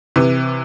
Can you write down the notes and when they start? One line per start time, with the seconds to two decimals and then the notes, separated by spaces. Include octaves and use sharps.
0.16 C3 E3